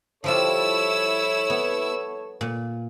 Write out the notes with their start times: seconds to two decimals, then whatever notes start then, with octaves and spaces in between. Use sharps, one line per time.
0.24 F3 G3 E4 F4 A4 C#5 E6
1.50 B3
2.41 A#2